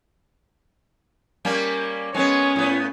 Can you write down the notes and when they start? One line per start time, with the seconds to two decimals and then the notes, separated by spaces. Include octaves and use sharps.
1.45 G3 A#3 C#4
2.14 G#3 B3 C#4 C#5
2.56 A2 B3